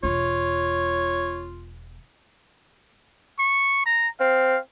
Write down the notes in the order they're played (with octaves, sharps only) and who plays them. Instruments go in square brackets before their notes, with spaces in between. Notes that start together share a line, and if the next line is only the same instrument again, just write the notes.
[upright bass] E1 E2 [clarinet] F4 [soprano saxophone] C#5
[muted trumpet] C#6
A#5
[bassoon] C4 [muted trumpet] F5